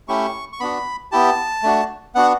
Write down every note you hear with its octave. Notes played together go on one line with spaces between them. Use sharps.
A3 C#4 E4 G4 C#6
C#6
B3 D4 F#4 B5
B3 E4 G4 A5
A3 D4 F#4
B3 D4 F#4 F#5